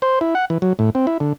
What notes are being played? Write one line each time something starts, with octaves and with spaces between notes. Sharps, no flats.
C5
E4
F#5
E3
F#3
A2
C4
E4
D3